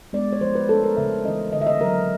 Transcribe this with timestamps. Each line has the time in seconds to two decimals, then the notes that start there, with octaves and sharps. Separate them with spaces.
0.13 G#3 B3 D4 D5
0.33 C#5
0.41 F3 C5
0.55 B4
0.69 A3 D4 A4
0.83 A#4
0.97 C#3 E5
1.25 E3 G#3 C#4 D#5
1.53 D3 D#5
1.61 E5
1.67 D#5
1.80 F#3 A#3 A#4